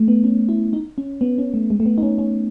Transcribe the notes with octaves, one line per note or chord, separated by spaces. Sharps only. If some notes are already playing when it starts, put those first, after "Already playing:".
Already playing: A3
B3
C#4
E4
D#4
C#4
B3
C#4
A3
G#3
A3
B3
D#4
C#4
C#4